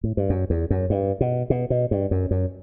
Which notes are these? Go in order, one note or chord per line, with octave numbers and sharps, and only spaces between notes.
A2
G2
F#2
E2
F#2
G2
B2
B2
B2
G2
F#2
F#2